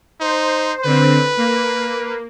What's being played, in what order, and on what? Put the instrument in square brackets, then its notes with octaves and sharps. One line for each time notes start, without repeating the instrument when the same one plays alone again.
[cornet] D#4 [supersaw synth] C5
[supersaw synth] D3 C4 [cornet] B4
[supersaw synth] A#3